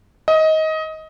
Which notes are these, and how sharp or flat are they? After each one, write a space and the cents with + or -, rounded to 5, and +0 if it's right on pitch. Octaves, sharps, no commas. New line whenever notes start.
D#5 +20